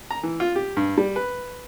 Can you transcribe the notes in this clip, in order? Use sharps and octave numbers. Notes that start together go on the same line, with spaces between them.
A#5
E3
F4
G4
G2
G3
B4